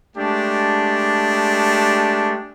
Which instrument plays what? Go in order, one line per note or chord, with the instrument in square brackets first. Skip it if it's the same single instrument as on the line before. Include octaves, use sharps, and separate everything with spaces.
[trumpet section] G#3 A3 D4 G4